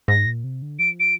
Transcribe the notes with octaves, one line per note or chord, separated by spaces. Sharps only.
G#2 A#6
A#2
C3
D3
F3 D7
D7